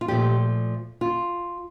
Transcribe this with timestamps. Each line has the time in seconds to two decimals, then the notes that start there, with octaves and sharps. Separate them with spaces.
0.01 F4
0.08 A#2 F3 A3 G4
1.01 F4